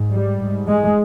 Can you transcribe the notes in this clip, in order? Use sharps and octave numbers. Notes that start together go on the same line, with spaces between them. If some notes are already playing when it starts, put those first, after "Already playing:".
Already playing: G#2
G3
G#2
G#3